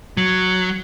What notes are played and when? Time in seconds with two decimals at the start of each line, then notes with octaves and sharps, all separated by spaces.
0.17 F#3